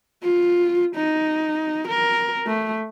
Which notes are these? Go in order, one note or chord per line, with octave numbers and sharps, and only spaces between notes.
F4
D#4
A#4
A3